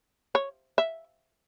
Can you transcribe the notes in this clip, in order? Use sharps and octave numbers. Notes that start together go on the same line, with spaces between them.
C#5
E5